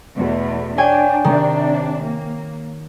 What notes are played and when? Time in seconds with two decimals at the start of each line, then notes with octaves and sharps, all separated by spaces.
0.14 E2 B2 A3
0.78 D4 C#5 G5 G#5
1.24 C3 D#3 D4
2.03 A#3